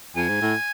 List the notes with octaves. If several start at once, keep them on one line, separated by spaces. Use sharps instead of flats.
F2 G#5
G#2
A2